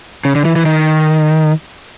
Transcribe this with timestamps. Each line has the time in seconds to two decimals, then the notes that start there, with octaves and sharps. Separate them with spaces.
0.25 C#3
0.35 D3
0.45 E3
0.56 E3
0.66 D#3